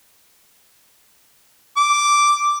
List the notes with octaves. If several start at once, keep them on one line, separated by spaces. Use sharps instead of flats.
D6